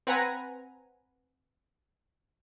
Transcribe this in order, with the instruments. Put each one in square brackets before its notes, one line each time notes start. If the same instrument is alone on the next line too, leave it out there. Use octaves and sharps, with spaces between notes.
[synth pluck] C4 B4 F#5 G#5 A#5